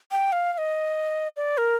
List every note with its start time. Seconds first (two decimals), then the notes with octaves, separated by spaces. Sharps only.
0.11 G5
0.32 F5
0.53 F5
0.58 D#5
1.37 D5
1.58 A#4